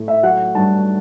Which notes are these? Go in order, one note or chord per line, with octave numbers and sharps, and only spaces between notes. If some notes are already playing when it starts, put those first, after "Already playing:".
Already playing: A2 A3
E5
F#3 F#5
G2 A5